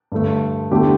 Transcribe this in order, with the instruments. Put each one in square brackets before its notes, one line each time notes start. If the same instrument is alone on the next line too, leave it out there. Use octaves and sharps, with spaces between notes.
[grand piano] G2 D3 A3
E2 D3 A3 G4